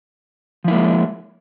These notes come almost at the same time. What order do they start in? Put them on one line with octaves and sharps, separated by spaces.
F3 E4 A#3 G#3